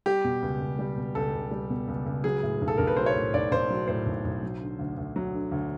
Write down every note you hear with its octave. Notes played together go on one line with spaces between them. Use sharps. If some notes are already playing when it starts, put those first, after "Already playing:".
G3 G4
B2
C#2
C#2
G3
B2
C#2 A4
C#2
G3
B2
C#2
C#2
F#3 G#4
A2
B1
A4
B1 A#4
B4
F#3 C5
C#5
A2
B1 D5
B1 C5
F#3
A2 C5
B1
B1
F#3
D3
D2
D2
F#3
D3
D2